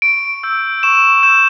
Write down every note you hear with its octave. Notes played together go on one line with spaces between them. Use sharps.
C#6 D7
E6 G6
C#6 E7
E6 G6 E7